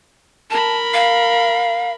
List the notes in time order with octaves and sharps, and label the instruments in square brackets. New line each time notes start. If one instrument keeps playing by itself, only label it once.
[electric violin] A#4 B5 [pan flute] A5
[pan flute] F5